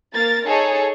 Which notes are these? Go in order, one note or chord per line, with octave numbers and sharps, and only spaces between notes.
A#3 A#4 A6
D#4 G#4 A4 C#5